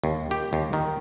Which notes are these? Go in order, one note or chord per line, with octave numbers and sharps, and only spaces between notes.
D#2
G4
D#2
D#3